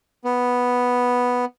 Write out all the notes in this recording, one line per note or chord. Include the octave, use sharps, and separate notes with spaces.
B3